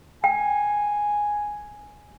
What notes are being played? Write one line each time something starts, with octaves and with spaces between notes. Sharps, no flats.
G5 G#5